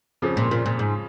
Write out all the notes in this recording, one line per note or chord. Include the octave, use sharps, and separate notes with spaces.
F2 C#3 F3
A#2
A#2
A#2
G#2